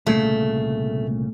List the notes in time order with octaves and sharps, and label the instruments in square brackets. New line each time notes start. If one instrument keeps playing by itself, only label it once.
[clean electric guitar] C2 A#2 C#3 [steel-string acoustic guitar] A3